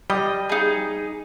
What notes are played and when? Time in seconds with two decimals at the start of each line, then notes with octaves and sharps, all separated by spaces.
0.10 G3 D#5
0.49 D#4 G#4